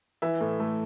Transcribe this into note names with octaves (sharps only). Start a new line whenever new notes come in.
E3 E5
A2
A3